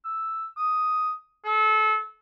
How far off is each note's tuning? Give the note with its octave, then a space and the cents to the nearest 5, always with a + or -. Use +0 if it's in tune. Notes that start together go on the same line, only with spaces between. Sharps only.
E6 +0
D#6 +5
A4 -30